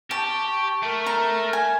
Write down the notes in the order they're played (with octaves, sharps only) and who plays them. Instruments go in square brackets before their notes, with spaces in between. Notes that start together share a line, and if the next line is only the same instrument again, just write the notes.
[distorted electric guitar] G4 [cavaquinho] A5 [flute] C#6
[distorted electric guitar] A3 [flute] A#4
[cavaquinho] A#5
G#5